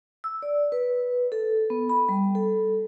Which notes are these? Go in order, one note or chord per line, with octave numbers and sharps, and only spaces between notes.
E6
D5
B4
A4
B3
B5
G3
A4